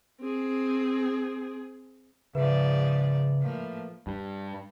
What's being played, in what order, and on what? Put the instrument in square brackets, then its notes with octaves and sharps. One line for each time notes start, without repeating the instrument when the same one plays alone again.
[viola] C4 G#4
[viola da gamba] G#2 F3 D5 [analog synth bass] C#3 [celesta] B4 E5
[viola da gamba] A2 F3 A#3
[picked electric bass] G2